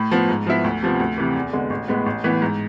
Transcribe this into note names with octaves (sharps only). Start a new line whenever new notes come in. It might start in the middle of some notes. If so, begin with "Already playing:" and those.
Already playing: A2
F3 B3
G#2
F3 B3 E4
D2
C3 F3 B3
D2
C3 E3
E2
D3 G#3 B3
A1
A2 G#3 B3
A1
A2 E3 B3
G#2